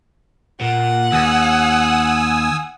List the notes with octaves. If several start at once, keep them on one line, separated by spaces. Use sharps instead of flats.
A#2 F#5
D#2 G#5 D#6 E6